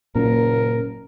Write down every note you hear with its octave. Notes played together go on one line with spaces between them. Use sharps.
F#1 A#2 A#4